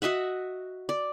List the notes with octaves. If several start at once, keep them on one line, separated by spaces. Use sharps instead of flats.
F#4 D#5 E5 F#5
D5